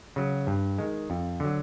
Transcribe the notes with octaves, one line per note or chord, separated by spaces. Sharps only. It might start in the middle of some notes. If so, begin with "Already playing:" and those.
C#3 F#3
G2
D#3 G#3
F2
D3 F#3